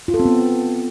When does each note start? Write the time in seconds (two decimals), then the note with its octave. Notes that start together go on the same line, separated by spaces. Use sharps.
0.08 F4
0.14 A4
0.20 C4
0.25 B3